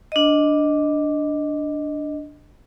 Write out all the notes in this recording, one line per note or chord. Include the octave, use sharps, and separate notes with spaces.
D4 D#5